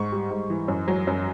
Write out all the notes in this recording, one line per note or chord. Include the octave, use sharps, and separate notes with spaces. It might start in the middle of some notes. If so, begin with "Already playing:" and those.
Already playing: G#2 C#6
G3
G#2
E3
F#2
F#3
F#2